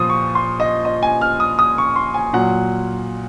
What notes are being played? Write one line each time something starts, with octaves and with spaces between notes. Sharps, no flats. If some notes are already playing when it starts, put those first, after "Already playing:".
Already playing: A#2 F3 D#6
C#6
C6
D#5
D#5
G#5
F6
D#6
D#6
C#6
C6
G#5
A#2 F#3 F#5